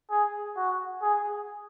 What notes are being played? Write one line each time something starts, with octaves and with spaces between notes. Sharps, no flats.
G#4
F#4
G#4